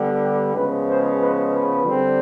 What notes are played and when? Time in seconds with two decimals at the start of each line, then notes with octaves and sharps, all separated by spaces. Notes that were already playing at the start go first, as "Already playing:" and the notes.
Already playing: D3 G3 B3
0.21 G4
0.54 C#3 F3 G#3 B3 B4
0.87 C5
1.20 B4
1.52 B4
1.85 D3 G3 C4